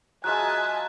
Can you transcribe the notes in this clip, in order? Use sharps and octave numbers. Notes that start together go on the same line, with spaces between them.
F#3 G#3 F4 D#5 E5 G#5 A5 F#6